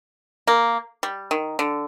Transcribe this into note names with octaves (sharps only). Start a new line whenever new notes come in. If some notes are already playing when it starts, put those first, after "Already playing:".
A#3
G3
D#3
D3